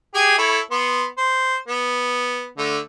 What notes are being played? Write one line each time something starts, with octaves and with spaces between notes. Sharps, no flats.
G4 G#4 G#5
E4 A4 C#5
B3 C6
C5
B3
D3 A3